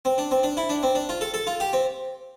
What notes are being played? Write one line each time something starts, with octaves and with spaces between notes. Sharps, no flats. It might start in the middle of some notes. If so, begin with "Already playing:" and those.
C4
D4
C4
D4
E4
D4
C4
D4
F4
A4
A4
F4
G4
C4